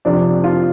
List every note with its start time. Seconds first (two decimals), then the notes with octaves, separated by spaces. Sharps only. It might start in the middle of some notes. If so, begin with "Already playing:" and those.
0.05 F2 C3 F3 D4
0.44 F4